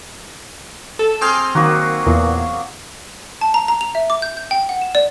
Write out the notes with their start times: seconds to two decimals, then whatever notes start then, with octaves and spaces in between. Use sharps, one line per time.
0.99 A4
1.21 C4 G#4 D6 F6 G6
1.55 D#3 F#3 A#3 F#4
2.06 E2 A#2
3.41 A5
3.54 A#5
3.68 A#5
3.81 F7
3.95 E5
4.10 D6
4.22 G6
4.37 G6
4.51 G5
4.69 F#5
4.81 E7
4.95 D5